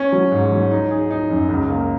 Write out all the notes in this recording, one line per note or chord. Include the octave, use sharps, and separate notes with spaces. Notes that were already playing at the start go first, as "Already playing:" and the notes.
Already playing: C#4
F#3
G#2
F#3
D#4
G#4
D#4
F#2
C#2
A#3